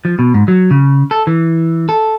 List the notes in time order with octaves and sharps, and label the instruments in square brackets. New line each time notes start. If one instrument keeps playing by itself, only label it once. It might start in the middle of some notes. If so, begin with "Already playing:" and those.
[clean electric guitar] F3
B2
G#2
F#3
C#3
A4
E3
A4